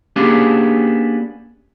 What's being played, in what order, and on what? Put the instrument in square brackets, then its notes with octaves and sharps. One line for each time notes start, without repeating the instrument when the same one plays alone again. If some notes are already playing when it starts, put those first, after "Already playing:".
[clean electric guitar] A#3 B3 C#4 D4 G4 G#4